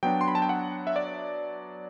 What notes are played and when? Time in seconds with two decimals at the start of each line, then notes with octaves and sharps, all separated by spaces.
0.03 F#3 B3 D4 G5
0.21 C6
0.28 B5
0.35 A5
0.42 G5
0.49 F#5
0.87 E5
0.96 D5